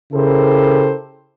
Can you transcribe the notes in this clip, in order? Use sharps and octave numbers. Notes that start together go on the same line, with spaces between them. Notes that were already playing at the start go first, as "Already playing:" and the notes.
C#3 E4 G4 A4 A#4 C5